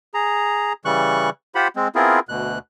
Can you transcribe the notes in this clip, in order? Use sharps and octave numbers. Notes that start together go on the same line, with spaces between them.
G#4 A#5
C#3 E3 G3 C#6 F#6
F4 G4 C5 F#5 B5
G#3 C4
B3 C4 E4 F4 G#4 A#4
D2 B2 F#6